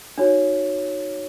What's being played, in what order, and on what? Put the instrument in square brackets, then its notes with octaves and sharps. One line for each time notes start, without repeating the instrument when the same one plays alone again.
[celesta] D#4 F#4 C#5